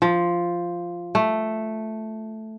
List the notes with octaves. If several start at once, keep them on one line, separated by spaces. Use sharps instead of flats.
F3
A3